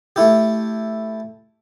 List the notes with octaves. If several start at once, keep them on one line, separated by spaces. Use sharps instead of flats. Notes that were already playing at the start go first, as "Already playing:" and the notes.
A3 E4 G4